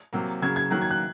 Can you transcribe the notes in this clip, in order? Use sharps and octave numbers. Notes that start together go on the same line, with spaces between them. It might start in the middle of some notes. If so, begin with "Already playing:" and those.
C3 F#3 A#3
C#3 F#3 A#3 G#6
G#6
D#3 F#3 A#3 F#6
G#6
F#6